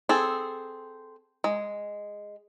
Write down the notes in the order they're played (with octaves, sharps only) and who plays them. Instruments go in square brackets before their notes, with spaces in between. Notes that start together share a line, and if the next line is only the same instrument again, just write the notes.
[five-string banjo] C4 G#4 A4
G#3